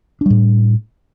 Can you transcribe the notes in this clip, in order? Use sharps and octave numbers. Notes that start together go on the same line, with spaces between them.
A2 G3 D4